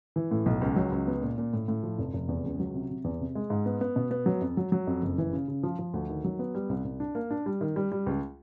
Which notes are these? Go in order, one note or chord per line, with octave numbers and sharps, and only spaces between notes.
E3
A2
B1
C#2
F#3
C#2
B3
A#2
A#2
A2
A2
F3
F1
F1
E2
C#2
F#3
C3
C3
E2
C3
G#3
G#2
B3
B3
B2
B3
F#3
F2
F#3
F#3
F2
F#1
E3
C#3
C#3
F3
F3
D2
D#3
F#3
B3
G3
C2
C2
D4
A#3
D4
G3
D#3
G3
G3
C#2